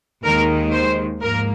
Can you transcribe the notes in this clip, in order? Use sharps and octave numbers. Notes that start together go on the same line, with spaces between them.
D#2 D#3 G#3 A#4
C5
G#2 F3 A#3 A#4